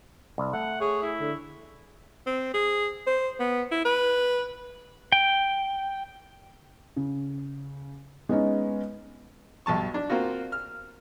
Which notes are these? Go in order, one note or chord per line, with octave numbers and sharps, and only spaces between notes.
C2
A3 F#5
G#4 C#5
E4
D3
C4
G#4
C5
B3
E4
B4
G5
C#3
G#3 B3 C#4 D#4
B1 G2 A5 C#6
D4
A#3 C4 F4 F#4
F6